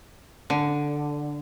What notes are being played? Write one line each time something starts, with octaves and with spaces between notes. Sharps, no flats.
D3